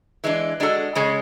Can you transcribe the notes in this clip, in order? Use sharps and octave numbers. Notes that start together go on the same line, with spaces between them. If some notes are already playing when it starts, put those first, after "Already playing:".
E3 G#3 D4
G#3 D4 F#4 A4
C#3 G#3 C#4